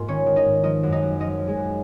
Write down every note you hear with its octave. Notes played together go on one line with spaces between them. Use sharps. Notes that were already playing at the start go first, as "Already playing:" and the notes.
Already playing: G#2 A#3 F4 A#4
D#3 C#4 C#5
D#3
D#4 D#5
G#2
F3 D#4 D#5
F#2
D#4 D#5
F#2
F3 D#4 D#5
F3
G#3 G#4
F#2